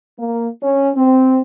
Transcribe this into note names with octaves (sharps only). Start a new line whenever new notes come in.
A#3
C#4
C4